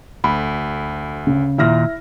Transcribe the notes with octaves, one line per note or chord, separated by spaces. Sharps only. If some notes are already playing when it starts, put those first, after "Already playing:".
D2 B5
C#3
D#2 A#2 E4 E5 F6 A#6